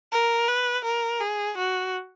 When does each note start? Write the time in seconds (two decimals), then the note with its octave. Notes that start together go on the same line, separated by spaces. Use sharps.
0.12 A#4
0.48 B4
0.85 A#4
1.20 G#4
1.57 F#4